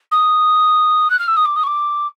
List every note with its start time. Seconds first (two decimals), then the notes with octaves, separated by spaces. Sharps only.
0.11 D#6
1.10 F#6
1.19 F6
1.28 E6
1.36 D#6
1.45 D6
1.56 D#6
1.63 C#6
1.67 D6